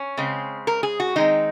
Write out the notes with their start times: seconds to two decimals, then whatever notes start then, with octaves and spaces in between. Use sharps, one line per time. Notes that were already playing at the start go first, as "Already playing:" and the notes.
Already playing: C#4
0.17 C#3 G#3 C4
0.67 A#4
0.83 G#4
1.00 F#4
1.16 D#3 G#3 C4 D#4